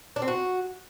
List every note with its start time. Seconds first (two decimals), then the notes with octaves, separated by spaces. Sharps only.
0.16 D4
0.22 C4
0.28 F#4